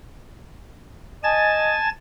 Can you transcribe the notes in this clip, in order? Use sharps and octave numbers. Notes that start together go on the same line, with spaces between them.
D#5 G#5 A5 A6